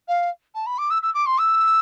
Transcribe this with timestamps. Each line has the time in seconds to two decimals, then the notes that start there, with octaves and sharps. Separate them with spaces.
0.08 F5
0.55 A5
0.66 B5
0.78 D6
0.90 E6
1.02 E6
1.14 D6
1.26 C6
1.38 E6